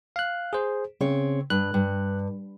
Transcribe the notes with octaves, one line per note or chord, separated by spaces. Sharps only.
F5 F#6
G#4 C5
C#3 C4 C#5
G2 F#6
G2